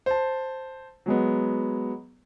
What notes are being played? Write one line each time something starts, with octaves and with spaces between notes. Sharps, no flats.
C5 A5
F#3 G#3 B3